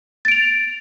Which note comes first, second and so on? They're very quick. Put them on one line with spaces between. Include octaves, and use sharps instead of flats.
A6 D7 F7